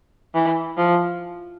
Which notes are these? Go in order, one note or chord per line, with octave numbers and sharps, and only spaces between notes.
E3
F3